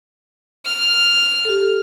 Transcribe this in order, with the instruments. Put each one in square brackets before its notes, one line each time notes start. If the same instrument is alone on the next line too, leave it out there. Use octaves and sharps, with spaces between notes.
[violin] F6
[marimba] G4 A4